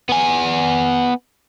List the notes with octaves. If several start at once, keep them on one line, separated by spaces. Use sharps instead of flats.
B3 G#5